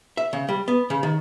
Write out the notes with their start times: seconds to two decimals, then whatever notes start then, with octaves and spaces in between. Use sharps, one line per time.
0.17 E5
0.33 C#3
0.49 G3
0.68 B3
0.90 C#3
1.03 D#3